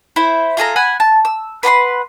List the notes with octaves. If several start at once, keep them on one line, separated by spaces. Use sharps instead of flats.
E4 C5
F4 G#4 A4 A#5
F#5 G#5 B5
A5
E6
B4 F#5 B5 C6